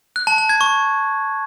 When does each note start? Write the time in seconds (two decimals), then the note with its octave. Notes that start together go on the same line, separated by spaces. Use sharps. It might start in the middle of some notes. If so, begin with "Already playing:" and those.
0.16 F#6
0.27 A5
0.38 A5
0.49 G#6
0.61 C#6